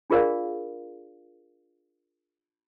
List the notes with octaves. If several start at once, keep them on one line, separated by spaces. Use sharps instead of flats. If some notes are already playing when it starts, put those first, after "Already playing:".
D4 F4 G#4 A#4 D5 F5